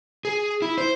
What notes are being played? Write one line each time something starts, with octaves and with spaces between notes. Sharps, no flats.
G#4
E4
C5